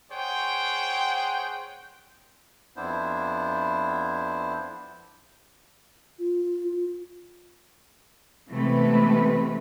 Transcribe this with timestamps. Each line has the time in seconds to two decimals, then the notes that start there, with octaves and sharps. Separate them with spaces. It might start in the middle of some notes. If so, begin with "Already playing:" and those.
0.11 G#4 C5 C#5 F#5 G5
2.76 F2 B3 D4 E4 C5
6.19 F4
8.51 C3 E3 G#3 A3 B3 B4